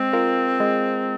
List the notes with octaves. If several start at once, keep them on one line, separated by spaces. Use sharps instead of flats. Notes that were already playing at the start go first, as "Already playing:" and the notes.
Already playing: G#3 C4
F4 A#4
G#3